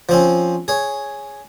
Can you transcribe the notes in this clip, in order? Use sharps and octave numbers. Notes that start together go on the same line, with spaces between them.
F3 C4 C#4
G#4 C#5